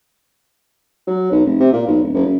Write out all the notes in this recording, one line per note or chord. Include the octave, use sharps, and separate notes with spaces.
F#3
B1
F1
C3
A#2
B1
D1
F#1
F#2